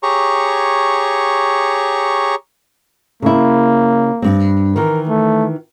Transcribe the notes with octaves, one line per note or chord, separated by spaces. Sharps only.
G4 G#4 C#5 A#5 C#6
C#3 A#3 E4
G2 C4
D#3 E3 A#4
A3